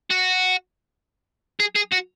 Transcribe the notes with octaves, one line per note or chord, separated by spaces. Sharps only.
F#4
G#4
G#4
F#4